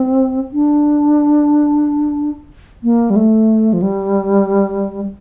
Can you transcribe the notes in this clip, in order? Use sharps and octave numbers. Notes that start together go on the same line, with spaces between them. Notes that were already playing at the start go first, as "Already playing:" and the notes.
Already playing: C4
D4
A#3
G3
A3
F3
G3